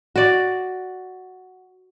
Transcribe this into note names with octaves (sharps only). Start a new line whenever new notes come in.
F#4 D5